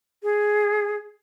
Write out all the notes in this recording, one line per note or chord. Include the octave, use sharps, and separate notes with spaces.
G#4